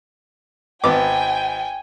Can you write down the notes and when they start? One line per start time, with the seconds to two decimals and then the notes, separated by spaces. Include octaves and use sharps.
0.84 G#1 B3 G5 G#5 D6